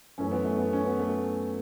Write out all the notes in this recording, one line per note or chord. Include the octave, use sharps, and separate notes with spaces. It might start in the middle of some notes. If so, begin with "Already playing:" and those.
F#2 E3 A3 C#4
B3
A3
B3
C#4
B3
A3